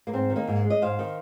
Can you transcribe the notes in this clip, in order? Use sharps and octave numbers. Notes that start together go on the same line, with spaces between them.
A#3
G#2 C4
D#3
A#3 D#4
G#2
G#3
D#5
G#2 C5 F5
D#3